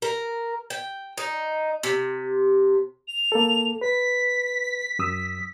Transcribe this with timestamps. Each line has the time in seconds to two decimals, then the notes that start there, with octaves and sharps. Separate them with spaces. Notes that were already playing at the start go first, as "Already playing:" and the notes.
0.02 A#4
0.70 G5
1.18 D#4
1.83 C3
3.08 F7
3.32 A#3 A4
3.81 B4 B6
4.99 F#2 D#6 E6